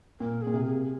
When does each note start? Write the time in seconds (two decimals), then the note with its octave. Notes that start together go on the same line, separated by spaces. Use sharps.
0.20 A#2 A#4
0.42 A#2 G#4
0.54 C3
0.65 G#4